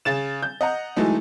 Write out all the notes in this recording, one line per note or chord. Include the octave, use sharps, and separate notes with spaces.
C#3 A6 E7
G6
D#5 F#5 A#5
E3 F#3 G#3 A3 D#4